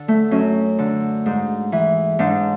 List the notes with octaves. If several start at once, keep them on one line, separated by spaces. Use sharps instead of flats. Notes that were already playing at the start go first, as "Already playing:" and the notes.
Already playing: D3
A3
F#2 C#4
D3
G#2
E3
G#2 D4